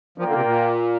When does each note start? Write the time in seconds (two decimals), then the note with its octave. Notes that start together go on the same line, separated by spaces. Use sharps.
0.18 F3 A#3 F4 A#4 D5 G5
0.28 D3
0.35 C3
0.45 A#2